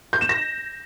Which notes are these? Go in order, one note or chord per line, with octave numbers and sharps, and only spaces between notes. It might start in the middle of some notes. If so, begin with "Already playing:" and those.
G6
E7
A#6